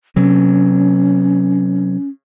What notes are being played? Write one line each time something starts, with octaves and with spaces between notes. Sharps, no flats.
C3 F#3 C#4